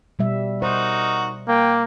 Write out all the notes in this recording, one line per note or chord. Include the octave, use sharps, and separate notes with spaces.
B2 G3 E5
D#4 F#4 A#4 C5
A#3 G5